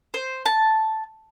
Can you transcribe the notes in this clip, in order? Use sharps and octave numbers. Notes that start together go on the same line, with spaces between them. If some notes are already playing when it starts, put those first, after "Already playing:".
C5
A5